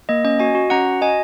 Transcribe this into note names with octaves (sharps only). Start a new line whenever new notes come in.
A#3 D#5
C#4 D#5
F#4 D#5 G#5
F#4
C#4 F#5 A#5
F#4
F#4 D#5 G#5